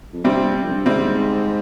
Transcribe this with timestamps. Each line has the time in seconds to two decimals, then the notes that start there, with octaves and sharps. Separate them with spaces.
0.13 F2
0.24 G2 C3 G3 C4
0.55 G2
0.64 F2
0.72 G2
0.86 G#2 C3 G3 C4